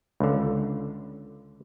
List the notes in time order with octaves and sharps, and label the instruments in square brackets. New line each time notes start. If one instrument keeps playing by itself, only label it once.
[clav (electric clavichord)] C#2 D3